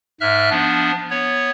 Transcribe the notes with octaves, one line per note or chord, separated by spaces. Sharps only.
G#2 E5 F6 F#6
F3 B3 D4
B3 C#5